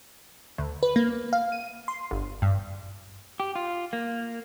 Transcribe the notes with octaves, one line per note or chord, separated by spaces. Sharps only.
D2
B4
A#3
F5
D#7
C6
G1
G2
G4
F4
A#3